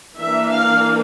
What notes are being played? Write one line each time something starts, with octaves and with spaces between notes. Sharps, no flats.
E3 A#3 D4 E5
F5